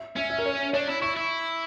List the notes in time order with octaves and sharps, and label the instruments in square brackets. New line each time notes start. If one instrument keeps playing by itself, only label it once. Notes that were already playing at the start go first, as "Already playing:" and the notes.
Already playing: [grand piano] E5
[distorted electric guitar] C#4 [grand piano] E5
[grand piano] E5
A#4
C#5
[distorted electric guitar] D4 [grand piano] C#5
[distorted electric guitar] E4
[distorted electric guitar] E4 [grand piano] C#6
[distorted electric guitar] E4